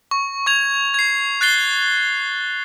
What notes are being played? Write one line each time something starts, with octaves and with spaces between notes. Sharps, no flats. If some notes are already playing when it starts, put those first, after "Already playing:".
C#6
C#6 G#6 F7
G#6 C7
F#6 A6 C7 G7